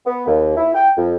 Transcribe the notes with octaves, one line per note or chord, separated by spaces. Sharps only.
B3
D#2
E4
G5
F2